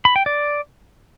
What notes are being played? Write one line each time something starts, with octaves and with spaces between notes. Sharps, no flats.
B5
G5
D5